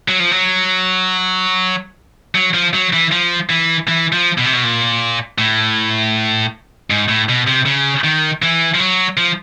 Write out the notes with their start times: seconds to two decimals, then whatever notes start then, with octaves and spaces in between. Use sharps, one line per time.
0.08 F#3
0.20 F3
0.31 F#3
2.35 F#3
2.54 F3
2.74 F#3
2.93 E3
3.12 F3
3.50 E3
3.88 E3
4.12 F3
4.38 B2
4.46 C3
4.53 B2
4.64 A#2
5.38 A2
6.90 G#2
7.09 A2
7.29 B2
7.47 C3
7.66 C#3
8.04 D#3
8.42 E3
8.74 F3
8.80 F#3
9.17 F3